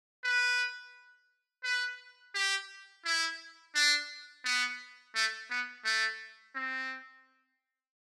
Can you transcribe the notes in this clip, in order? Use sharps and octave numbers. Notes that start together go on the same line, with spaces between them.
B4
B4
G4
E4
D4
B3
A3
B3
A3
C4